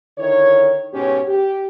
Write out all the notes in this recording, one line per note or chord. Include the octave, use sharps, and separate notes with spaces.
D3 D#3 E4 C#5
G#2 B2 C#4 F#4 G4 C#5
G4